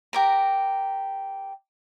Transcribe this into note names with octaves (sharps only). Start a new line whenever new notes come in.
G4 A#4 A#5